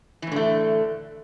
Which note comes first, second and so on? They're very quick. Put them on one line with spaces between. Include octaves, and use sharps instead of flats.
E3 A2 D3 A3